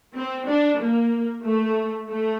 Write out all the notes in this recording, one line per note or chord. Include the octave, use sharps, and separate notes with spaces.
C4
D4
A#3
A3
A3